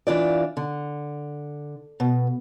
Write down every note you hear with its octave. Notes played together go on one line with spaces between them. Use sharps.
E3 D4 F4 D5
D3
B2